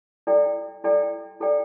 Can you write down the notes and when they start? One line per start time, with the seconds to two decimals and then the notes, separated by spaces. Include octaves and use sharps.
0.27 E4 A4 D5 G5
0.84 E4 A4 D5 G5
1.40 E4 A4 D5 G5